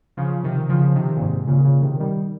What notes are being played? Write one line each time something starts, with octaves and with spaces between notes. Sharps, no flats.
C#3 F3
C3 D#3
C#3 F3
C3 D#3
A#2
G#2 C3
A#2 C#3
A#2 C#3
C3 D#3
D#3 G3